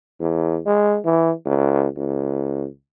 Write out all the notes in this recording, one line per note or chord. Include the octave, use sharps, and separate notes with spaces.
E2
G#3
E3
C#2
C#2